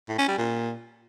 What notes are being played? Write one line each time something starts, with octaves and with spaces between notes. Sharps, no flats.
A2
C#4
G3
A#2